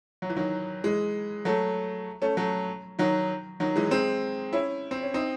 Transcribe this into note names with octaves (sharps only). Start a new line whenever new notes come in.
F#3
E3
D#3 F#3
E3 G#3
F#3 A3
A3 C#4
F#3 A3
D#3 F#3
D#3 F#3
E3 G#3
G#3 C4
C#4 E4
C4
C#4
C4 D#4